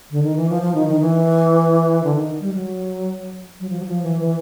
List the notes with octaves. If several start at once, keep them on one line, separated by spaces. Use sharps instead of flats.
D3
D#3
E3
F3
F3
D#3
D#3
E3
D3
D#3
G3
F#3
F#3
F3
F#3
F3
E3
E3